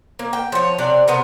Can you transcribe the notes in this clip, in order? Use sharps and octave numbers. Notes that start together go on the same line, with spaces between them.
A#3
G5
F3 C#5
C3 D4 D5
C3 B3 A#4